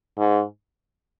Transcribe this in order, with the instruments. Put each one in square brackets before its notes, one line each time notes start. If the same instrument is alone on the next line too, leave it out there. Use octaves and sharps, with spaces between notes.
[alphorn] G#2